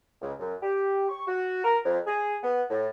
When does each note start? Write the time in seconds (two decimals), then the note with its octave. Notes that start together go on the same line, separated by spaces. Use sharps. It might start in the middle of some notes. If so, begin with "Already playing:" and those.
0.22 C#2
0.40 F#2
0.62 G4
1.09 C#6
1.27 F#4
1.64 A#4
1.85 F2
2.06 G#4
2.43 B3
2.70 A2